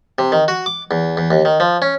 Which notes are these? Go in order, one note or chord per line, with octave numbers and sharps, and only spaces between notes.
C3
D#3
F#4
D6
E2
E2
D#2
D#3
F3
C#4